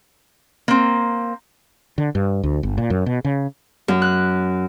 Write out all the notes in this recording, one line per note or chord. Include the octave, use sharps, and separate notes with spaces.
A#3 C4
D3
G2
D2
G1
A#2
F#2
B2
C#3
F#2
F#6